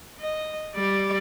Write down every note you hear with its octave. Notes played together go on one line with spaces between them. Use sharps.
D#5
G3 D5